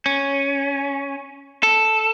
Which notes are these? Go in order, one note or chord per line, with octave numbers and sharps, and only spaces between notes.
C#4
A4